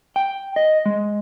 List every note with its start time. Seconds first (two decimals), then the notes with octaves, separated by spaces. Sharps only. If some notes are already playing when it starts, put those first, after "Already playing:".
0.16 G5
0.56 D#5
0.86 G#3